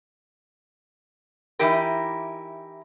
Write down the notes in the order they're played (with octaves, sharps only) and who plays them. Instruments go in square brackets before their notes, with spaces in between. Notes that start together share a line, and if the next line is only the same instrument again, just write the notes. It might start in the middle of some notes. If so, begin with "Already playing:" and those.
[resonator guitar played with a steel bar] E3 D#4 E4 G4 A#4